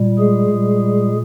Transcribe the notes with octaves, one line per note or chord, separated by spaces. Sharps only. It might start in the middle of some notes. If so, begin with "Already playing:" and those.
Already playing: A#2 G3
G#3 G#4
A#2 G3